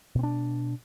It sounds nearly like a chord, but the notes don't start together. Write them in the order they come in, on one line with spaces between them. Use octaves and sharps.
B2 C4 D4